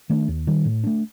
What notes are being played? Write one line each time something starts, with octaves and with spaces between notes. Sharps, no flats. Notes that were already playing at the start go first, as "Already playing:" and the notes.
D#3 A3 D4
D#2
D#3 G3
A2
A3 D4